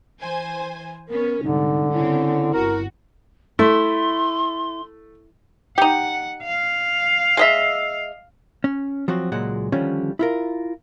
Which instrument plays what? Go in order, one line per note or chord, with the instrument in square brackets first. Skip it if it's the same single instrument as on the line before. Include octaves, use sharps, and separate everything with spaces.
[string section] E3 C5 G#5
[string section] B3 C#4 [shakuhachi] A#4
[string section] C2 G#2 [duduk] D3 [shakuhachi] D#4
[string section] C#3 C4 C#4 [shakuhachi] E4
[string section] G1 F#4 [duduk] A#4
[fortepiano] A3 [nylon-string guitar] E4 [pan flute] C6
[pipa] D#4 G4 [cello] F#5
[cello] F5
[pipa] G#3 D#5 E5
[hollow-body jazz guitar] C#4
F3 F#3 C4 F#4
C#2 A#2 F#3 G#3 F#5
D3 D#3 F3 G3 C#4
E4 F4 A#4